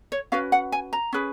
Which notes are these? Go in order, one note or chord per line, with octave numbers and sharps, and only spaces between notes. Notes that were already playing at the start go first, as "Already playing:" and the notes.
C#5
C#4 F#4 B4 F5
F#5
G#5
A#5
C#4 G#4 B4